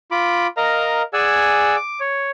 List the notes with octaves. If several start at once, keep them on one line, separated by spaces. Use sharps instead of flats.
F4 B5 D6
A#4 D#5 F5 A#5
G#4 D5 F#5 G#5 E6
D6
C#5